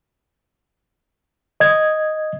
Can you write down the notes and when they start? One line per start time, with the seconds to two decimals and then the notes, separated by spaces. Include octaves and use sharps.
1.60 D#5 G#6